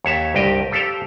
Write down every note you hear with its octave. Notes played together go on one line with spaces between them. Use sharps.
D#2 C#5 E5 A5
C2 G2 G4 D#5 G5
G4 A4 C5 F5 G5